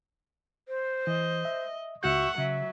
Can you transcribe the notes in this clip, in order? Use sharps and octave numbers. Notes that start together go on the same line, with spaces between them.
C5
E3 D#5
E5
C#2 F#4 E5 F#5 C#6 G6
C#3 F#3 E5